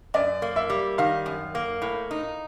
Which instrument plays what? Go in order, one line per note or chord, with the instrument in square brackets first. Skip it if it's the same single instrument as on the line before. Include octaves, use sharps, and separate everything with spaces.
[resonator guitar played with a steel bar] F#2 [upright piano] D5
[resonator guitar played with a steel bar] A#3
[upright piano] E5
[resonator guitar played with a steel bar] G3
[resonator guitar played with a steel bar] D#3 [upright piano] F5
[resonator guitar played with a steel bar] F#2
A#3
A2
D#4